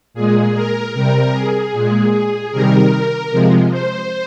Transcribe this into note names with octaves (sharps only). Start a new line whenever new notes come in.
A#2 G#3 G#4
A#4
C3 G3 A#4
G#4
A#2 G#3
C3 D#3 G3 A#4
C3 F3 G#3
C5